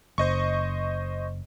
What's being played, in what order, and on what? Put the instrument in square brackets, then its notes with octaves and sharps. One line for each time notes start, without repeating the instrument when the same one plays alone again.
[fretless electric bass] F#1 [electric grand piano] C5 D#5 C#6